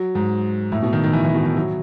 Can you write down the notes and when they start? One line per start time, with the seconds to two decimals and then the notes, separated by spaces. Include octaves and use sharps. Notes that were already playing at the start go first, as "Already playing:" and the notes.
Already playing: F#3
0.15 G#2
0.72 A2
0.82 B2
0.93 D#3
1.03 D#3
1.13 E3
1.24 E3
1.35 B2
1.45 D#3
1.56 F#3